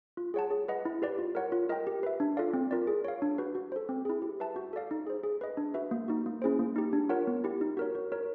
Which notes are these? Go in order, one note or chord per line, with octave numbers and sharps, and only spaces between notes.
F4
G#4 C#5 F#5 A5
G#4
B4 D#5 F#5
E4
G4 B4 D5
F4
A#4 C#5 F#5
F4
A#4 D#5 G5
G4
B4 E5
D4
F4 A4 D5 F5
C4
F4 A#4 D5
G#4
C#5 F5
D4
F#4 B4
F#4
A4 C5
C4
E4 G#4
G4
B4 E5 A5
F#4
A4 D5 F5
D#4
G#4 C5
G#4
B4 D#5
D4
F#4 B4 E5
A#3
D#4 F#4
A#3
C#4 E4 G#4 C5
A#3
D#4 G4
D4
F4 A#4 C#5 F#5
B3
E4 G4
D#4
F#4 A#4 C#5
F#4
A#4 C#5